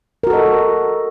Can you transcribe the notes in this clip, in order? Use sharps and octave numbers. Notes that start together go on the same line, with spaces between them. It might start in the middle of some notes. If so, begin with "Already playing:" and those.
F#4 A4 A#4 D#5